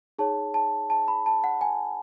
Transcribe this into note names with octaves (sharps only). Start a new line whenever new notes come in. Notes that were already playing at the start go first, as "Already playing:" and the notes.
D#4 G#4 C#5 A5
A5
A5
B5
A5
F#5
G#5